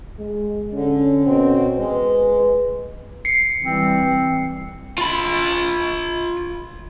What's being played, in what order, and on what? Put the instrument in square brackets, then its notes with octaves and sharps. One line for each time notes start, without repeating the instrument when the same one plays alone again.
[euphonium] G#3
[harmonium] D3 [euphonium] C#4
[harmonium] B2 C4
[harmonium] G#3 [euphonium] B4
[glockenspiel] C7 C#7
[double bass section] E3 G3 [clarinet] C4
[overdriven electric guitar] F4 B5